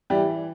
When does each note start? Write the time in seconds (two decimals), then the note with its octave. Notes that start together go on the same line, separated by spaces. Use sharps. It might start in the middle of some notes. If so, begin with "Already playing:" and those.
0.10 E3 G3 G4